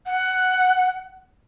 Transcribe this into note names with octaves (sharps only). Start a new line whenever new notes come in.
F#5